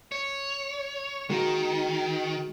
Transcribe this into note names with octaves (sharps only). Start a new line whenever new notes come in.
C#5
D#3 G#3 A#3 F#4